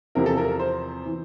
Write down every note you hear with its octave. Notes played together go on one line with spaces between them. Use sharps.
E2 C3 F3 C4 E4 A#4
A4
A#4
A#4
C5
E3